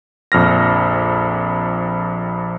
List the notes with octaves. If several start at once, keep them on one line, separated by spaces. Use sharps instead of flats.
A#1 F2 F6 A#6